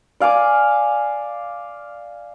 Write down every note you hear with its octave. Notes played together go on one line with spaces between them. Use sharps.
D5 F5 G#5 D6